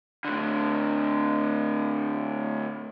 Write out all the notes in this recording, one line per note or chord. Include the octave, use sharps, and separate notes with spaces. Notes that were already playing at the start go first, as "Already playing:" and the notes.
A2 D3